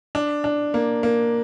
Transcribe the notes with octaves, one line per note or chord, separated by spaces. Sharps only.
D4
D4
A#3
A#3